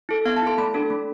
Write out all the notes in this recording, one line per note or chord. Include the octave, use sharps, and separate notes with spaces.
E4 A4
B3 F5
A5
E4 A4 C6
A3 B5
D4 A4
A3